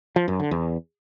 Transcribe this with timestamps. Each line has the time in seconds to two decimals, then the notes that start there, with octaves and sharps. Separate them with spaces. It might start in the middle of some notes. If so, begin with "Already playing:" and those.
0.16 F3
0.28 F#2
0.40 D3
0.51 E2